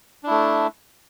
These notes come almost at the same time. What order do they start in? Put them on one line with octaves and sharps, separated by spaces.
D4 E4 A3